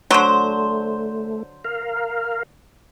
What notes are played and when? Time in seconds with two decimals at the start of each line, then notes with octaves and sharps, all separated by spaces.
0.11 D3 F#3 A3 C5
1.64 A#4 F5